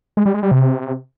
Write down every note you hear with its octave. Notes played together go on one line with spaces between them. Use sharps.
G#3
G3
G#3
G3
C3